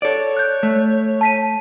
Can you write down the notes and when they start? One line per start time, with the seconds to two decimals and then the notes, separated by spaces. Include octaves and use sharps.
0.02 A4 C#5 D5
0.37 F#6 G6
0.63 A3
1.21 A5 B6 D#7